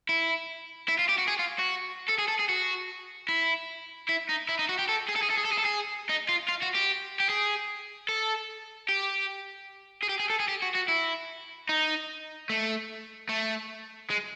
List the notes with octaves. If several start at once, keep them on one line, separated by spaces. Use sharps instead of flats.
E4
E4
F4
G4
F#4
G#4
F4
F#4
A4
G#4
A4
G#4
F#4
E4
E4
D#4
E4
D#4
F#4
G4
A4
G#4
A4
G#4
A4
G#4
A4
G#4
A4
G#4
D#4
F4
F4
F#4
G4
G4
G#4
A4
G4
G#4
G4
G#4
A4
G#4
G4
F#4
F#4
E4
D#4
A3
A3
G#3